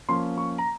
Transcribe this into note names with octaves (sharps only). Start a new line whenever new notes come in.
F3 A#3 C#4 C6
C#6
A#5